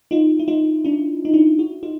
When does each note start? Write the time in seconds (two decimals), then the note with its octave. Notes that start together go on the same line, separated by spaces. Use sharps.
0.11 D#4 F4
0.39 E4
0.48 D#4 F4
0.85 D4 E4
1.25 D#4
1.33 D4 E4
1.59 E4 F#4
1.83 D#4 F4